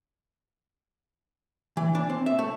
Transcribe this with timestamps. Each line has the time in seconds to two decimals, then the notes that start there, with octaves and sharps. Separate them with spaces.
1.77 E3
1.95 D4
2.09 C4
2.26 E5
2.39 A3